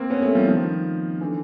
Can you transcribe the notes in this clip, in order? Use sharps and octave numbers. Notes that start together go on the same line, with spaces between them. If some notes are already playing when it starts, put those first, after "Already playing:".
Already playing: A#3 C4
B3 C#4
A3 B3
F3 G3
D#3 F3
D3 E3